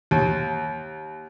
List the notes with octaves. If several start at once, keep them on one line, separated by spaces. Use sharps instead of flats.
D#2